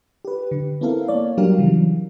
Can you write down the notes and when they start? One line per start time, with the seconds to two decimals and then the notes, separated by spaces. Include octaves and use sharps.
0.25 G4 B4
0.51 D3
0.81 B3 C4 E4 A4 A#4 F5
1.08 A#3 C#5 D5
1.37 F#3 G3 D4 G4 A#4 F5
1.58 C#3 E3 F#3